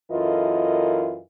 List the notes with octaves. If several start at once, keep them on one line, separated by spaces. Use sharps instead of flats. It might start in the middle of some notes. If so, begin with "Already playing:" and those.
F#2 E3 F4 A4 A#4 D#5